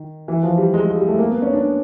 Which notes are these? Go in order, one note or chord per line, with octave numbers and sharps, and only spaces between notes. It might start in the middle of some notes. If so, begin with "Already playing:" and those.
Already playing: D#3
E3
F3
G3
G#3
G#3
G3
A3
A#3
B3
C#4
D4